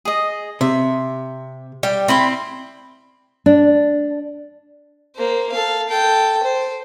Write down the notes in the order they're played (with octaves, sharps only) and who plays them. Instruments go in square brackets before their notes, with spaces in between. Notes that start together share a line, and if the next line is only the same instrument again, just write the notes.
[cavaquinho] G#4 D#5
[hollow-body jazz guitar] C3 [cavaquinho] E5
[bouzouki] G3 [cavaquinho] G5
[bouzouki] C4 [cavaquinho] E4 B5 C6
[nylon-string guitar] D4
[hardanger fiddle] A#3 C5
A4 F5
A4 G5
C5